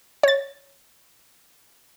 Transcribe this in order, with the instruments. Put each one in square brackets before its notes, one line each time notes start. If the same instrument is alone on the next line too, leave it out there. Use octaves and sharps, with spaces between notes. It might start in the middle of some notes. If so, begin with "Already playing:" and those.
[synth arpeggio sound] C#5 A6